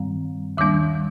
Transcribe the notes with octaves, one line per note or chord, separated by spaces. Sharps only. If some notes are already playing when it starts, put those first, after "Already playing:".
Already playing: G2 D#3 G3 C4
D#2 D#3 G3 A#3 D4 D6